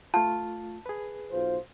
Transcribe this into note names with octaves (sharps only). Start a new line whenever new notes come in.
A3 F4 A5
G#4 B4
B1 F4 C5